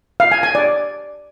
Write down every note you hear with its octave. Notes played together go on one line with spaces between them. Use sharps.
F5
G#5
G#5
D5